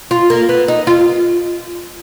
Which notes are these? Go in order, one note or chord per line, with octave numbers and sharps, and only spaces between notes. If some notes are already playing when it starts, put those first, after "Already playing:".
F4
A#3
B3
D#4
F4